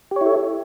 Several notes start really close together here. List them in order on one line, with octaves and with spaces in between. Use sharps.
G4 C#5 E4 A4